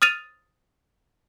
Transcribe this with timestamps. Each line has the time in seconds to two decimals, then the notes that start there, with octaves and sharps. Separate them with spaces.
0.02 D#6 F6 A6 D#7 F7